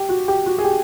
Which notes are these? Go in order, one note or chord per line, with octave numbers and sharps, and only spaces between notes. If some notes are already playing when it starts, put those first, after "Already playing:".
Already playing: G4
F#4
G4
F#4
G#4
G4